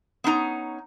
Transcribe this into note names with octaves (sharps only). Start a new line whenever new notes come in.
B3 C#4 D#4 A#5